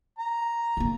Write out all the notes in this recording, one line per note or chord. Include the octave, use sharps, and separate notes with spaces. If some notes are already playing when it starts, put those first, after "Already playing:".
A#5
D3 A#3